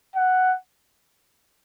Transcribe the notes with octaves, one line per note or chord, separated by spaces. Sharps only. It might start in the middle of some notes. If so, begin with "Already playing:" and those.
F#5